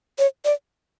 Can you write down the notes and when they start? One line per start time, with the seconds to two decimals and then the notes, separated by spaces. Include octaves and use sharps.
0.19 C#5
0.45 D5